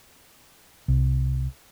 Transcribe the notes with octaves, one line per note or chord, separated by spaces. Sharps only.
C2